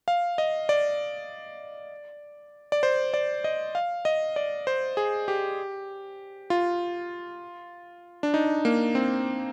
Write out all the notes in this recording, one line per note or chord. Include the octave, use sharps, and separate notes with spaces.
F5
D#5
D5
D5
C5
D5
D#5
F5
D#5
D5
C5
G#4
G4
F4
D4
D#4
A#3
C4